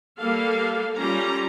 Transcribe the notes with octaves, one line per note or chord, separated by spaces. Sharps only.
G3 A#3 A4 F5
G3 C#4 F4 A#5